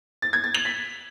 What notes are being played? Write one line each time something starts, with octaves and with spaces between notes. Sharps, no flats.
A6
G#6
A6
F#7
B6